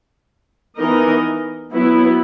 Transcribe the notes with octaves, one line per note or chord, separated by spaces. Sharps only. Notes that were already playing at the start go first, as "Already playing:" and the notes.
E3 B3 D#4 A#4 D#5
F#3 B3 E4